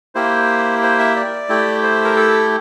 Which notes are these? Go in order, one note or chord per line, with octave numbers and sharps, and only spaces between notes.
A#3 E4 G4 C5
C5
E5
D5
A3 E4 G4
C5
A#4
A4